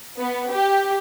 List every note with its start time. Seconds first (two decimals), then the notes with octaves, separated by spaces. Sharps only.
0.18 B3
0.53 G4